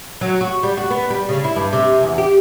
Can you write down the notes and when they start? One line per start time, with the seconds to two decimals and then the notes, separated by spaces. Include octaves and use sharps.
0.21 F#3
0.41 F#4
0.63 G3
0.77 F#4
0.90 B3
1.10 G3
1.29 C#3
1.44 E4
1.56 G2
1.73 C3
2.03 E2
2.18 G4